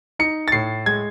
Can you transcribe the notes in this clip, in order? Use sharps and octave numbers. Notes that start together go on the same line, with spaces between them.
D#4 C#7
A6
A2 C7
G#3 G#6